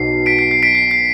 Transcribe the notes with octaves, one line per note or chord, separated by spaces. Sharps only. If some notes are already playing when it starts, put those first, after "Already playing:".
Already playing: B1 B2 C7
B6 D7
C7
C7
B6 D7
C7
C7